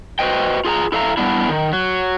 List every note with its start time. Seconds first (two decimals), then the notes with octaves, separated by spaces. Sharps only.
0.19 F#4 B4 C5 D#5 G5
0.65 F4 G#4 G#5 A#5
0.92 E4 A4 E5 F5 A#5
1.17 G3 B3 D4 E4
1.49 D#3
1.73 F#3